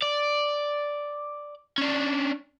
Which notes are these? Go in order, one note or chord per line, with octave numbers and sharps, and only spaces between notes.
D5
C#4 D4